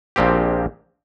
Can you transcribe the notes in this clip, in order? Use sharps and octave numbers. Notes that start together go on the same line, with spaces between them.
A#1 A#2 F3 C4 G4